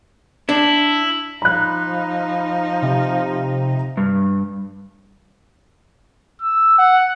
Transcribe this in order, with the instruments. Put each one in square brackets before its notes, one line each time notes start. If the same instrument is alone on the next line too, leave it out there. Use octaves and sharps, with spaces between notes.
[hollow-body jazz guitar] D4 [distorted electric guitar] E4
[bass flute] F3 [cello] D#4 [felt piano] B5 F#6
[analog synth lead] C3
[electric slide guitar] G2
[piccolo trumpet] E6
F#5